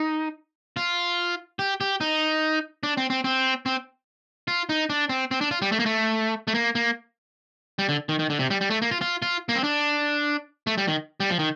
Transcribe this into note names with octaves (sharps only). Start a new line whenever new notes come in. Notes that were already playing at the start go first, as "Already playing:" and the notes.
Already playing: D#4
F4
G4
G4
D#4
D4
C4
C4
C4
C4
F4
D#4
D4
C4
C4
D4
F4
G3
A3
A#3
A3
A3
A#3
A#3
G3
D3
D#3
D#3
D3
C3
G3
G3
A3
A#3
F4
F4
F4
A#3
C4
D4
A3
G3
D#3
G3
F3
D#3